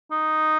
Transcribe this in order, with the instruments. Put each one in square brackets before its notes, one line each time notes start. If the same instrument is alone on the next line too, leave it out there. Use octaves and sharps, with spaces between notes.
[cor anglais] D#4